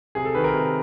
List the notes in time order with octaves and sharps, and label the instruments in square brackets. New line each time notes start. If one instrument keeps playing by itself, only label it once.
[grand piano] C3 G#4
A4
D#3 B4
A#4
C3